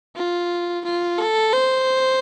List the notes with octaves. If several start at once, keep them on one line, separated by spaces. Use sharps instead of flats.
F4
F4
A4
C5